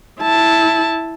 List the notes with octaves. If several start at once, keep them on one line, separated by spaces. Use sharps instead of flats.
E4 A5